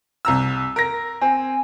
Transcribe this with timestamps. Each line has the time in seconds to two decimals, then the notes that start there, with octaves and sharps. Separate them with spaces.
0.25 C2 A#5 E6
0.76 A#4 A#6
1.21 C4 G#5